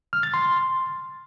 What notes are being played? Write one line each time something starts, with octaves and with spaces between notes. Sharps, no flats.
F6
A6
C6